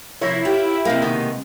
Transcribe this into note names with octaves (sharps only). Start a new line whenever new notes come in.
C3 F3 E4 A#4 C#5
F4 G4 G5
C3 G#3 A#3 G4 A#4 F5
B2 D#3 B3